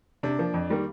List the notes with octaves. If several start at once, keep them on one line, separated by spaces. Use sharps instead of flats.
C3 D4
F3 A#3
F2
D#3 G3 A#3